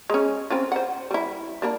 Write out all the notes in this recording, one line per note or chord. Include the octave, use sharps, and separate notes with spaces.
G#3 C#4
C4 C#4 F4
C5 F#5
G3 E4
G3 A#3 D4